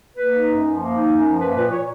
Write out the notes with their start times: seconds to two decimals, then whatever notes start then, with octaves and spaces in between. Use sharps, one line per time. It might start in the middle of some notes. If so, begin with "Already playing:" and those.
0.17 A#3 B4
0.32 D#4
0.48 F#2
0.64 F3
0.79 A#3
0.94 D#4
1.10 F#2
1.26 F3
1.41 A#3 B4
1.56 A#2 B4
1.71 A#2 C#5